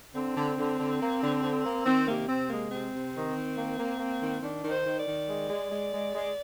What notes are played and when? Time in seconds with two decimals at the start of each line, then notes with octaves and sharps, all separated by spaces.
0.15 D3 C4
0.36 D3
0.57 D3
0.79 D3
1.01 A#3
1.22 D3
1.43 D3
1.64 A#3
1.86 D#3 C4
2.08 C3 A#3
2.28 C3 C4
2.50 G#3 A#3
2.71 C3 C4
2.92 C3
3.14 D#3
3.36 D#3
3.57 A#3
3.79 A#3
4.00 A#3
4.21 D#3
4.42 D#3 D4
4.63 D#3
4.70 C5
4.86 D#3
4.99 D5
5.07 D#3
5.29 G#3
5.49 G#3
5.71 G#3
5.93 G#3
6.13 G#3